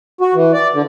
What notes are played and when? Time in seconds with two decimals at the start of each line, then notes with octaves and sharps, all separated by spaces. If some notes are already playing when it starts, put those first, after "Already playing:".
0.21 F#4
0.34 E3
0.53 D5
0.74 D3